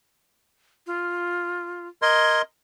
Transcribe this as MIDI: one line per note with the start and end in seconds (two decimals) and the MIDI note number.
0.87 1.88 65
2.02 2.42 70
2.02 2.42 75
2.02 2.42 84
2.02 2.39 92